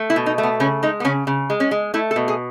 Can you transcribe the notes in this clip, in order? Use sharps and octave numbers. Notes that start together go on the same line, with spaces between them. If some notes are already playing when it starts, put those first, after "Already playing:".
Already playing: A3
E4
B2
D#4
A3
B3
C#3 C#4
G#3 D#4
B3
C#3 C#4
C#3
G#3
C#4
G#3
A3 E4
A4
B2
G#4